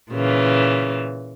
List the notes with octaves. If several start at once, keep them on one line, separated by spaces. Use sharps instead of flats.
A#2 C#3 E3